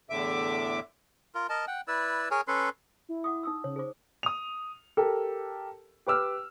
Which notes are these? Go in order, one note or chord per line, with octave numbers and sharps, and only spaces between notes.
E2 A2 D3 E5 D6
F4 A#4
A#4 D#5 A5
F#5 G5
E4 B4 D5 E6
G#4 A#4 C#5
C#4 A4 B4 C6
E4
F#5 D6 D#6
D#4 D#6 E6
C#3 C#5
G#4 C5 D6
D#6 F7
G4 A4 A#4
G4 B4 D6 E6 F6